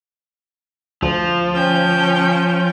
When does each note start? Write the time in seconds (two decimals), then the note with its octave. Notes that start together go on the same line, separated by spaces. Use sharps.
1.02 D2 F3
1.54 C#4 G5